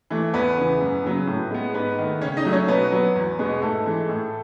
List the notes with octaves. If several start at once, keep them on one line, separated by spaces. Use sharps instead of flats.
E3 A3
E2 B3 B4
C#3 E3
F#2
C#3 F#3 B3
A2
G#3 B3
G#2 B3 B4
D#3 A3
C#3 C#4 C#5
D#4 D#5
F#3 A3
C#4 C#5
B2 B3 B4
F#3 B3
E2
B2 G#3 B3
G#2 A3 A4
E3 G#3
A2